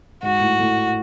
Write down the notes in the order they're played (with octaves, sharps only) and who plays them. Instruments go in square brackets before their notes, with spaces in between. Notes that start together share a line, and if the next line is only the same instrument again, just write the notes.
[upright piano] G#2 [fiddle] F#4
[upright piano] A2
A2